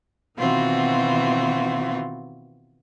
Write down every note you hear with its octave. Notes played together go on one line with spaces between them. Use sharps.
B2 D#3 E3 C4 F4 F#4